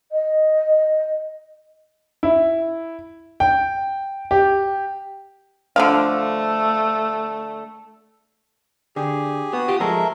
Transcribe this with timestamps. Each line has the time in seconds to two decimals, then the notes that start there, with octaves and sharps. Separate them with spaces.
0.12 D#5
2.23 E4
3.40 G5
4.31 G4
5.76 D3 F3 A3 F5
8.96 D3 G4 G#4
9.53 B3 F#4 D#6
9.68 F4 G4
9.80 F3 G#3 A3 A#4 E5